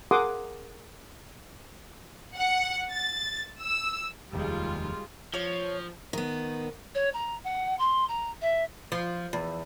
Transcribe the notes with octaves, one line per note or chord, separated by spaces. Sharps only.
G#4 A#4 F#5 C6 D6 D#6
F#5
A6
E6
F1 D#2 G3 G#3 F4
F3 C#5
D#3 B3
C#5
A#5
F#5
C6
A#5
E5
F3
E2